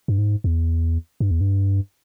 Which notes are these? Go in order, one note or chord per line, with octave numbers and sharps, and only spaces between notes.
G2
G#2
E2
G2
E2
G2